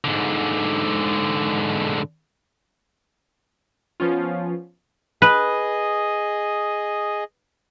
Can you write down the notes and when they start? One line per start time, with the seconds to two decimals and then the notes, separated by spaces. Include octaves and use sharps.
0.05 G#2 D3
4.00 F3 B3 C#4 F4
5.22 G#4 B4 D#5